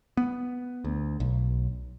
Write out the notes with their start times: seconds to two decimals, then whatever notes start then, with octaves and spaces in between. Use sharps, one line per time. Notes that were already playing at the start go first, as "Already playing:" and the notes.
0.17 B3
0.84 D2
1.20 B1